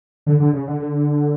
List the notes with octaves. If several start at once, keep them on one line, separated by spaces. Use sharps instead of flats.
D3
D3
C#3
D3
D3